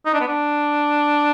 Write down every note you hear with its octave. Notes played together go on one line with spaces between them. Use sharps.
D#4
D4
B3
D4